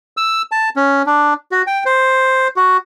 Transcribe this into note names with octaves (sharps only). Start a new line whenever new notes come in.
E6
A5
C#4
D4
F#4
G5
C5
F#4